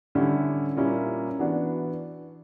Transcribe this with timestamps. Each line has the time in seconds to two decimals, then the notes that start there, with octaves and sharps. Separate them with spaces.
0.15 D3 G3 C#4 E4 G4
0.77 A#2 G3 A#3 C#4 E4
1.39 E3 B3 D4 F#4